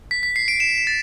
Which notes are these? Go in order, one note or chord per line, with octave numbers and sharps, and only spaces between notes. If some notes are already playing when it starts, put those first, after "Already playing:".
B6
B6
C7
D7
E7
E7
A6